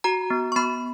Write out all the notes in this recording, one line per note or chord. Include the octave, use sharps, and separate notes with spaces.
F#4 A#5
B3
C#6
B3 B5